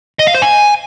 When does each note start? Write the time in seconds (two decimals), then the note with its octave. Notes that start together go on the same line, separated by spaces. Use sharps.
0.19 D#5
0.27 F5
0.34 C5
0.42 G#5